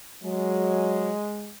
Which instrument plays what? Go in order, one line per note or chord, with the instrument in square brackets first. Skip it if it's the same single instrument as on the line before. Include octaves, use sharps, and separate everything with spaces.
[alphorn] F#3 [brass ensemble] G#3